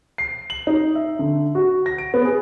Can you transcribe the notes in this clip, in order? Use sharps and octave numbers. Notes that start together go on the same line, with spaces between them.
C7
F#7
D#4
E5
D3
F#4
A#6
D7
B3
G#4